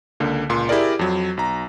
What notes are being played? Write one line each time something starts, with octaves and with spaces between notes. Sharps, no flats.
C#2 D3 A#3
C#2 A#2 C6
E4 G4 G#4 A#4 D5
F2 F#3
B1 A#5